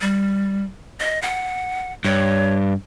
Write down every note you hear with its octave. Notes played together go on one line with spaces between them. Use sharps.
G3
D#5
F#5
G2 C#5